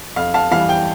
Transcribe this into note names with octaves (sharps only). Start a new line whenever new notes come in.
F2 F5
F5 A5
E3 G3 F5
G5